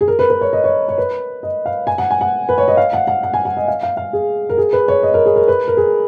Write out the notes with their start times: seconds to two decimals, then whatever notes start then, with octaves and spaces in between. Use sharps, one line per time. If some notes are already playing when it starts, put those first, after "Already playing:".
0.01 G#4
0.08 A#4
0.19 B4
0.30 B4
0.41 C#5
0.53 D#5
0.64 C#5
0.88 C#5
0.98 B4
1.43 D#5
1.66 F5
1.87 G#5
1.98 F#5
2.11 G#5
2.21 F#5
2.49 B4
2.58 C#5
2.68 D#5
2.77 F5
2.93 F#5
3.07 F#5
3.23 F#5
3.34 G#5
3.45 F#5
3.57 D#5
3.68 F5
3.83 F5
3.97 F5
4.13 G#4
4.50 A#4
4.58 G#4
4.73 B4
4.88 C#5
5.03 D#5
5.14 A#4
5.26 G#4
5.36 A#4
5.48 B4
5.68 A#4
5.77 G#4